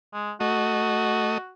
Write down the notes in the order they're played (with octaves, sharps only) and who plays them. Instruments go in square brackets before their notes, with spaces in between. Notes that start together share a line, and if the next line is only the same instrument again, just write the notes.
[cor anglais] G#3
[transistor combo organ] A3 D#5 [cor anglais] F#4